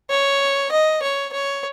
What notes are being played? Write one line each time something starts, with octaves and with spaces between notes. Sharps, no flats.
C#5
D#5
C#5
C#5